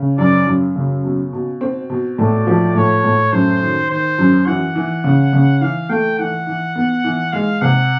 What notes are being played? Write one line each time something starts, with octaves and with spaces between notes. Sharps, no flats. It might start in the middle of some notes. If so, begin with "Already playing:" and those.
Already playing: C#3
F#2 D5
F#2
C#3
B2
B2
C4
B2
A2 D5
F3
A2 C#5
A2
F#2 C5
D#3
D#3 C5
F#2
E3 F#5
E3
C#3
C#3
E3 F5
A3 G5
E3 F#5
E3
B3
E3
G#3 F5
C3 F#5